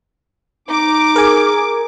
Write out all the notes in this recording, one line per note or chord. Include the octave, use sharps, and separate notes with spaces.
D#4 D6
G#4 A#4 G#5